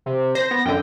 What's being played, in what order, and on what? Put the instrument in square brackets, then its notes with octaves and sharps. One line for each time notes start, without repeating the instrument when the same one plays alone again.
[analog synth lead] C3
[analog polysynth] C5 [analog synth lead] A#6
[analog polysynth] B3
[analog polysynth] F#2 D3 [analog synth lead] G5